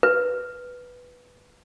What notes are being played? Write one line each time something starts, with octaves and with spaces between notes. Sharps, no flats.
B4